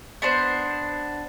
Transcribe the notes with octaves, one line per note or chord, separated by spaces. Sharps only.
B3 D4 C5